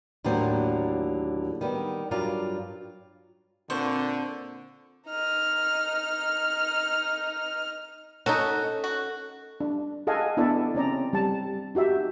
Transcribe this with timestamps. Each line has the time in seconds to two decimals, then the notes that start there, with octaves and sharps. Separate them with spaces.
0.24 D#2 A2 D3 F#3 A#3 C5
1.61 D#3 G3 B3
2.11 G2 F#3 F4 A#4 D5 F5
3.70 A#2 D3 C4 C5 C#6
5.07 D#4 F6
8.26 C#4 D#4 F#4 A4
8.84 F#4
9.60 D4
10.07 G#4 A4 D#5 F5 F#5 G#5
10.37 B3 D4 E4 A4 D5 E5
10.75 C4 C#4 D5 A#5
11.13 G3 A5
11.75 D#4 F#4 G4 E5